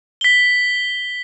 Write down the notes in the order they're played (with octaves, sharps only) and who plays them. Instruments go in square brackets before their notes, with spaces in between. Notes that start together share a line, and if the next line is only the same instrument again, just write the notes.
[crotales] B6 G7